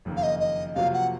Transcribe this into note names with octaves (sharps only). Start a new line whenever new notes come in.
F#1 F2 D#3 A#3
F5
D#5
D#5
F2 C3 F#3 A#3 F4 F5
F#5